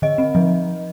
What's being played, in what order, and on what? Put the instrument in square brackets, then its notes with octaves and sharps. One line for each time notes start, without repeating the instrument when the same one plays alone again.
[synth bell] D3 D#5
C4
F3